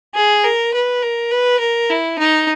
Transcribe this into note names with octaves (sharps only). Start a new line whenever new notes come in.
G#4
A#4
B4
A#4
B4
A#4
E4
D#4